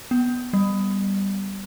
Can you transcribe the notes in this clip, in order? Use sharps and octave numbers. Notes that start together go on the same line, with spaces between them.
B3
G3